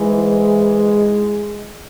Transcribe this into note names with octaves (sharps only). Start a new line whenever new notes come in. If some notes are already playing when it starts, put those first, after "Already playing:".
Already playing: G#2 E3 G#3